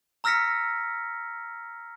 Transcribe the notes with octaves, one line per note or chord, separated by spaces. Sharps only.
A#5 E6 F6 A#6 B6 C#7